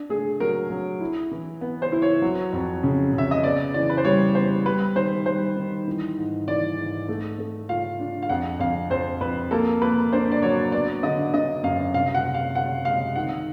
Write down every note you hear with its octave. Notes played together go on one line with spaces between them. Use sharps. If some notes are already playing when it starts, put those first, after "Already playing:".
Already playing: D4
A3 G#4
F#3 A#4
F#3
E4
E3
B3
C5
E4
C#5
F#3
F2
C#3
C#3
E5
D#5
B3 D5
E3 D5
B4
C5
G3 C#5
B3 C5
G3 B4
D#3 C5
G3 C5
D#3
E3
G#2
E3 D5
G#2
A3
A3
F4 F5
D4
F5
F2 F#5
F2 F5
F2 C5
F2 B4
A#3 A4
A#3 B4
D4 C5
D5
F#3 C#5
B3 D5
D3 D#5
D3 D#5
F#2 F5
C3 F5
F#5
C3
F5
C3 F#5
G#3 F5
D#3 F#5